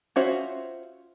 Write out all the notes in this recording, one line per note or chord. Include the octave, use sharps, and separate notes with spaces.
C#4 F4 F#4 C5 E5